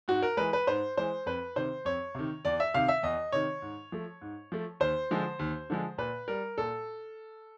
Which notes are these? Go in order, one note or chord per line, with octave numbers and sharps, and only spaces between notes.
G#2 F#4
A#4
E3 G#3 B4
B4
G#2 C5
E3 G#3 C5
F2 B4
C3 D#3 C5
F2 C#5
C3 D#3
E2 D5
E5
C3 D#3 F5
E5
E2 D#5
C3 D#3 C#5
G#2
F3 A3
G#2
F3 A3
D#2 C5
D3 F3 G#3
D#2
D3 F3 G#3
A#2 B4
G3 A#4
A#2 A4